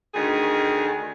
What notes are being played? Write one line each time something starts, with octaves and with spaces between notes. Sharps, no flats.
D2 D#3 G#4